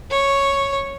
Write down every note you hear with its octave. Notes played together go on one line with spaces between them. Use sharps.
C#5